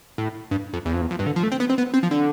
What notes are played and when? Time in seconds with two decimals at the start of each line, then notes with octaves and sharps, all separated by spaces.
0.18 A2
0.51 G2
0.73 F2
0.85 E2
0.93 F2
1.01 E2
1.11 F2
1.19 G2
1.26 D3
1.36 F3
1.43 A3
1.52 C4
1.60 B3
1.70 C4
1.78 B3
1.94 C4
2.03 F3
2.11 D3